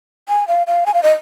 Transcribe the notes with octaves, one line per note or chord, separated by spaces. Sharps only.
G#5
F5
F5
G#5
F5
D#5